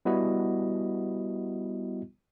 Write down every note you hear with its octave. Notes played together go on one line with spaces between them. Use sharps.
G3 B3 E4 F#4 D#5